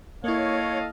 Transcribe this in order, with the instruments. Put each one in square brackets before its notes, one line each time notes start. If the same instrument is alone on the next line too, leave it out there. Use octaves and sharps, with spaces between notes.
[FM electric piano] A#3 E4 [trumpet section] A4 D#5 F5 [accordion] C#5